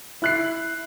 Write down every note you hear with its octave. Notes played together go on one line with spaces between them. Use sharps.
E4 F#6 C7